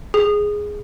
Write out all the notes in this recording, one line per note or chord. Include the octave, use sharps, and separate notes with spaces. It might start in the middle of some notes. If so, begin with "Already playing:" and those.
G#4